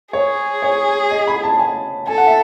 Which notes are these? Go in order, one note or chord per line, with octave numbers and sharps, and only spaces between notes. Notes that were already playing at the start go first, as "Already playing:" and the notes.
G#4 C#5
C#5
D#5
B5
A5
G#5
A4 G#5
F#5
E5